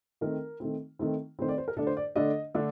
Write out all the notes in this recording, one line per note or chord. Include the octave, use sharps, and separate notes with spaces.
D#3 A3 C4 A#4
D#3 A3 C4
D#3 A3 C4
D#3 A3 C4 C5
D5
C5
A#4
D3 A3 D4 A4
C5
D5
D3 A3 D4 D#5
D3 A3 D4